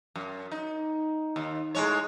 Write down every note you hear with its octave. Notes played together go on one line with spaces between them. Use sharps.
F#2
D#4
D#2
A2 G#3 C#5